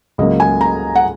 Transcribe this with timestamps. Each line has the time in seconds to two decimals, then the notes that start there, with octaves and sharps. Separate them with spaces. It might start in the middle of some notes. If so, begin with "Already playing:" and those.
0.18 C#2 C#3 F#3 A#3 D#5
0.40 G#5
0.61 A#5
0.95 F#5